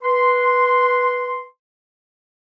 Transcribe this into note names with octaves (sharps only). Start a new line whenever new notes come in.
B4 C6